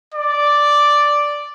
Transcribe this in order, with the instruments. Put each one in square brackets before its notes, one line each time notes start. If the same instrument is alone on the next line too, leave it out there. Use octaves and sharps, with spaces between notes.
[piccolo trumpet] D5